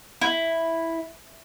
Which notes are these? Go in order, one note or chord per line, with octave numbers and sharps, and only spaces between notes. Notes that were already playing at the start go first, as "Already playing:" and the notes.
E4